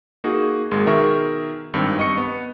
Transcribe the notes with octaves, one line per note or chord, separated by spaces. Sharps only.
A#3 D#4 F#4 G#4
G#1 G#3 A#4 C6
B2 D#3 G#4 A#4 E5 C#6
G#1 G2 D#3 C4 C#7
G2 D#5 C#6 C#7
B3